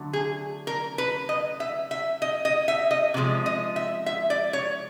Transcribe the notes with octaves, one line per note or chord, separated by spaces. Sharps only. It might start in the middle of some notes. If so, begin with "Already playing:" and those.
Already playing: D3 F#3 A3
G#4
A#4
B4
D#5
E5
E5
D#5
D#5
E5
D#5
C3 F3 G#3
D#5
E5
E5
D5
C#5